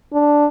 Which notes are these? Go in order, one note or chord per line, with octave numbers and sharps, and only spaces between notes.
D4